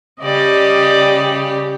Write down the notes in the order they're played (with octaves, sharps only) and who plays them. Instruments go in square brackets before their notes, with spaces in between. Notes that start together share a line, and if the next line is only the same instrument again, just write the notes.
[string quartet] C#3 G3 G4 [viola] D5 D#5